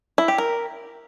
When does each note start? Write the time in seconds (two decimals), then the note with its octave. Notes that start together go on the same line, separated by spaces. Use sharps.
0.18 E4
0.28 G4
0.38 A#4